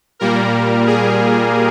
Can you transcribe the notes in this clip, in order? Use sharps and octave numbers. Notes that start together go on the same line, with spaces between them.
A#2 G3 A#3 A#4
G#4